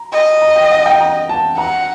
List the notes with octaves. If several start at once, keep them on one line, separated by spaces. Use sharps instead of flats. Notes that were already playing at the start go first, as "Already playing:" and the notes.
Already playing: A#5
D#5
A#5
G5
F#5
G5
A#5
A5
F#5 A#5